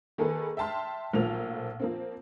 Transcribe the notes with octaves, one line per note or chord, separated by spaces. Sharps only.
D#3 A#3 G#4 A4 B4
E5 G5 A5 C6 F6
B1 A#2 F3 A3 A#3 F7
F3 A#3 C4